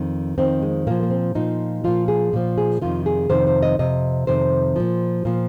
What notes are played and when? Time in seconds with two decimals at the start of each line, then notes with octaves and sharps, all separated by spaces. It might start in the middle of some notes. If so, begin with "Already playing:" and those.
Already playing: F2 D#3 C4
0.38 F2 D#3 C4
0.62 G#3
0.87 A#2 F3 A#3
1.03 A#3
1.10 C4
1.35 A#2 F3 D#4
1.84 A#2 F3 F4
2.08 G#4
2.33 A#2 F3
2.58 G#4
2.81 F2 C3 D#3 F4
3.06 G#4
3.29 F2 C3 D#3 C5
3.47 C5
3.63 D#5
3.79 F2 C3 D#5
4.27 F2 C3 D#3 C5
4.76 A#2 F3
5.25 A#2 F3